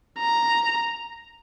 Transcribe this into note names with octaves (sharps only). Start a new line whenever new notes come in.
A#5